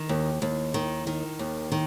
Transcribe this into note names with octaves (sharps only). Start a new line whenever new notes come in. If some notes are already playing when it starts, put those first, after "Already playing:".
Already playing: D#3
D#2
D#2
D#3
D#3
D#2
D#3